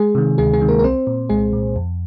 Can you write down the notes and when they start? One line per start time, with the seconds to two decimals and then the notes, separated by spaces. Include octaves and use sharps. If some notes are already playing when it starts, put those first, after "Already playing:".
Already playing: G#3 G#4
0.15 C3 D#3
0.38 D2 G#3 G#4
0.53 G#3 G#4
0.61 C3 D#3
0.69 A#3 A#4
0.79 A#4
0.84 C2 C4 C5
1.07 A#2
1.29 C2 G#3 G#4
1.53 A#2
1.76 F2